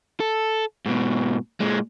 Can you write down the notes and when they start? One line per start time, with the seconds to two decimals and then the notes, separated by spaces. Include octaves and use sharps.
0.20 A4
0.86 G#2 B2
1.60 A#2 G#3